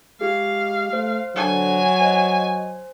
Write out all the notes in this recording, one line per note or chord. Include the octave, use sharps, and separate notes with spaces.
G#3 F4 G4 G#4 F5
A3 C5
D3 F#3 G#5
C5 D#5